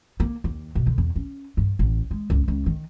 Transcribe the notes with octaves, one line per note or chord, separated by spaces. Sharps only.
A#3
D#2
B2
D3
E2
C#4
G2
A1
G#3
C#2
C#2
D#3